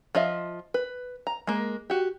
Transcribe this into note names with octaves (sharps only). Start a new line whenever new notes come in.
F3 F4 D#5 E5
B4
A#5
G#3 A#3
F#4 G4